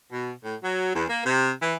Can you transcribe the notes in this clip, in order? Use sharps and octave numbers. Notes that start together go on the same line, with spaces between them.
B2
A2
F#3
E2
A#3
C3
E3